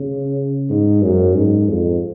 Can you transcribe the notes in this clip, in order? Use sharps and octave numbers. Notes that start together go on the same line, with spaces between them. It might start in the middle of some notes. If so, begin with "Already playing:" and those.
Already playing: C#3
G#2
F#2
G#2
F2